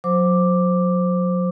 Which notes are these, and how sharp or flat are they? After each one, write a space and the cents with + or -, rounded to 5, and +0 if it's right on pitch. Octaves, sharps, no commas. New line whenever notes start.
F#3 -30 C5 +0 D6 +0